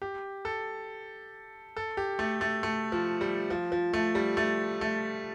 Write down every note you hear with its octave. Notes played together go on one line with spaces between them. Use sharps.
G4
A4
A4
G4
A3
A3
A3
F3
G3
F3
F3
A3
G3
A3
A3